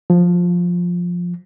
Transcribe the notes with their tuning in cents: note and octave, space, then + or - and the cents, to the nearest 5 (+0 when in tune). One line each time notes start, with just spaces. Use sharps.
F3 +10